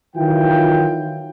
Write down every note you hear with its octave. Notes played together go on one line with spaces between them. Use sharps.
D#3 E3 F#3 E4 F4 G5